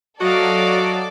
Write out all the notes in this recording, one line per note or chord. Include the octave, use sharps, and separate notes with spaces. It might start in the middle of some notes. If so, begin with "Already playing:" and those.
F#3 F#4 A4 D5 D#5 F5 D6